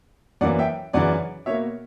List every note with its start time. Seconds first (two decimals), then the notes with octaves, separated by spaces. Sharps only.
0.41 F#2 E3 A#3 D5 F#5
0.59 E5 G5
0.93 F#2 C#3 E3 D5 F#5
1.46 B2 C#5 E5
1.50 A#3